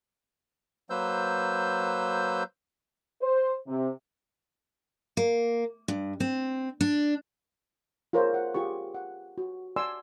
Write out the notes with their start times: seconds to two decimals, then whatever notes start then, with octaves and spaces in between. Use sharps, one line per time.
0.90 F#3 A#3 B4 C5 E6 G6
3.22 C5
3.68 C3
5.17 A#3
5.88 G2
6.20 C4
6.81 D4
8.13 F4 G#4 A#4 C5 C#5 F5
8.34 F#5
8.54 F4 G4 G#4 C#6
8.94 F#5
9.38 F#4
9.76 D5 F#5 G#5 C6 D6 E6